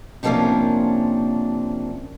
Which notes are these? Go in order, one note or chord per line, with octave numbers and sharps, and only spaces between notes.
C3 F3 G3 A#3 C#4 D4